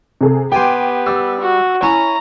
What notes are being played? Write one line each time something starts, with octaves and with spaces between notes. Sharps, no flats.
C3 G#4 A4
B3 G4 G5 G#5 C6
G3 E6
F#4
C#4 E4 A#5